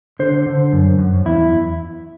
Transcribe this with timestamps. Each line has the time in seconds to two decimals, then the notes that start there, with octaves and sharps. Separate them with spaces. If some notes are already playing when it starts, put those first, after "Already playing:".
0.19 D3 C5
0.46 D3
0.73 F#2
0.98 F#2
1.25 E2 E4